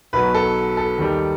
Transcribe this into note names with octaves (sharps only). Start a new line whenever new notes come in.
B1 B2 F#3 B3 B4
A4
A4
D#2 D#3 G3